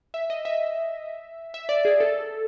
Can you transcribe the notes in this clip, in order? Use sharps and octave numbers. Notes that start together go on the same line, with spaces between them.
E5
D#5
E5
E5
D5
G#4
A4